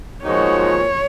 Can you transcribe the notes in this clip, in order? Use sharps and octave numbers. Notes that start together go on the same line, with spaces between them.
A#2 F3 G#3 D#4 F#4 C#5